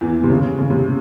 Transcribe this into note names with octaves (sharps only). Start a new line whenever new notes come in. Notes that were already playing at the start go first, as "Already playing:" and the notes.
E2 E3
C3
C#3
C#3
C3